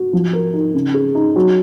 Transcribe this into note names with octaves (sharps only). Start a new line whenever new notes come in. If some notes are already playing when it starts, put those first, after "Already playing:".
Already playing: F#4
F3
A#4
D#4
C#3
G#4
D#4
F#3